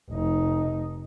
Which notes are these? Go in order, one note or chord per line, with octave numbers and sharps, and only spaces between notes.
F1 D#4